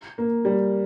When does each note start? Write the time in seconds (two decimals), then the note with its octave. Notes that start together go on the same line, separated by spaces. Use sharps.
0.18 A#3
0.45 G3